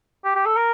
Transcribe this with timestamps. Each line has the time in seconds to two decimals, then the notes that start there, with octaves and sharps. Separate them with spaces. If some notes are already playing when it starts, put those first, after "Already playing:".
0.24 G4
0.35 G4
0.45 A4
0.56 A#4